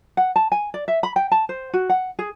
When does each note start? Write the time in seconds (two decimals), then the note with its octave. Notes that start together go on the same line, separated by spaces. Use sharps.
0.17 F#5
0.36 A5
0.52 G#5
0.74 D5
0.88 E5
1.03 B5
1.16 G5
1.32 A5
1.49 C5
1.73 F#4
1.89 F#5
2.19 G#4